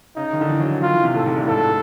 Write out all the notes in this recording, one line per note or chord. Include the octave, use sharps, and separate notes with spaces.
C#3 D#4
D#3
D3
E3
F#3
E3
D#3 F4
E3
C3
A2 A4
G#2
G2
A2
G#2 A4
A2